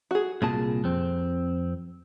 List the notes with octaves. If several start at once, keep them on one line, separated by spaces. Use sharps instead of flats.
F#4 G#4
C2 A#2 G#4 A5
F2 C4